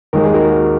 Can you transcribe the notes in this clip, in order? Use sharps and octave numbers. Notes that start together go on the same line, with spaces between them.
D#2 D#3 G#3 A#4
G#4
F#4 A#4